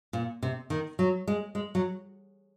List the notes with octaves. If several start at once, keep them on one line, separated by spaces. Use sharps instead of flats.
A#2
C3
D#3
F#3
G#3
G#3
F#3